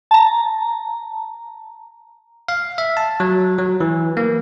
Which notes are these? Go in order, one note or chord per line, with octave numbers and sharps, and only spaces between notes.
A5 A#5
F5
E5
A5
F#3
F#3
E3
A#3